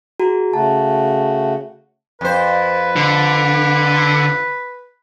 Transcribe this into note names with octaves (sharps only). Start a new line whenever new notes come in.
F#4 G#4 A#5
C#3 A3 F#4 A5
F2 B4 C5
D3